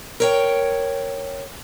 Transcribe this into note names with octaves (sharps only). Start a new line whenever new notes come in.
A#4 C#5 G5